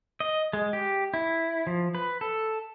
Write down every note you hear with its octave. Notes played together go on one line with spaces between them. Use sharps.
D#5
G#3
G4
E4
F3
B4
A4